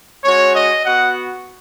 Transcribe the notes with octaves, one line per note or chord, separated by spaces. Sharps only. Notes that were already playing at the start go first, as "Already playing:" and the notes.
G#3 C#4 F#4 C#5
D#5
B3 F#4 F#5